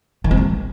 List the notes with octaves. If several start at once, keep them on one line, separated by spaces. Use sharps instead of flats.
D#3
C4
E3